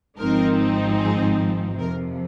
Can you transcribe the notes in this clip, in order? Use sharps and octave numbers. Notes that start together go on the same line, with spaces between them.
G#1 G#2 F3 C4 D#4 A#4
G#4
F2 C3 F3 A#4